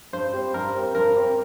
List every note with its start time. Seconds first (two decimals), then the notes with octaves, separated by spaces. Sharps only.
0.13 G2 C5
0.33 G3 C4 G4
0.54 G2 A#4
0.75 G3 C4 G4
0.95 G2 A#4
1.16 G3 C4 G4